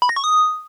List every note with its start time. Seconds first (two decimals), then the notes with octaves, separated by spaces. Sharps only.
0.02 B5
0.09 A#6
0.16 C#6
0.24 D#6